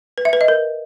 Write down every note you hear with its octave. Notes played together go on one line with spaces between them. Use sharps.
B4
E5
B4
D#5
A#4